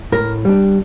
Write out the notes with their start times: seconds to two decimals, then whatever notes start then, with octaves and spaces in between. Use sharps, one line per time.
0.12 A2 A#4
0.45 G3 D4